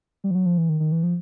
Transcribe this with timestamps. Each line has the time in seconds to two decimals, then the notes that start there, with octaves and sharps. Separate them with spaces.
0.24 G3
0.31 F3
0.35 F#3
0.46 F3
0.58 E3
0.69 D#3
0.80 D#3
0.92 E3
1.03 F3